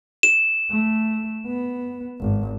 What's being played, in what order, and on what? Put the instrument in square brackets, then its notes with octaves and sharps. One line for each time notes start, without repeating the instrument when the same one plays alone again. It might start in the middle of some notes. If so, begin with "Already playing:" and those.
[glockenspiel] E7
[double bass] A3
B3
G#1